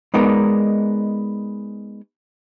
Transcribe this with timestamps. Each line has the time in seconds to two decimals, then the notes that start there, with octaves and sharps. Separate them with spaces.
0.14 G#3 B3 D#4 A#4 D5